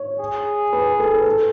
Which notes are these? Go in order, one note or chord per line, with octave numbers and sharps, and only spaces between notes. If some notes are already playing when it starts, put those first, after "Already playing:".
Already playing: C#5
G#4
B4
A4
B4
A4